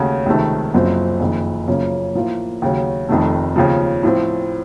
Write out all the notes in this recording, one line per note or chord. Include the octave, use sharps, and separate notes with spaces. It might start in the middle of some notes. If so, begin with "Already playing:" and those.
Already playing: D#2 C#3 A3 C#4 F#4
C#2 C3 D#3 A3
F#1 F#2 F3 C4
F#1 F2 D#3
F#2 C#3 F3 A#3 C#4
A2 F3 A#3 F4
D#2 C#3 F#3
F1 F2 D#3 A3
D#2 C#3 F3
A2 F3 C4